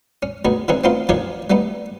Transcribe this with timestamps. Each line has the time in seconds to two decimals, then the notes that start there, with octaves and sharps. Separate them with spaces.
0.23 C#4
0.45 D2 B3 D#4 G#4
0.68 D3 E3 C4 C#4 D#4 G#4
0.84 A3 B3 C4 D#4 F4 C5
1.09 D#3 F3 D4 D#4 G4 C#5
1.50 G3 A3 B3 D#4